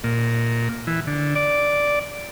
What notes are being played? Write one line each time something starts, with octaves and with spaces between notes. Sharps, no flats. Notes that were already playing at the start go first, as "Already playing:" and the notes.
A#2
E3
D3
D5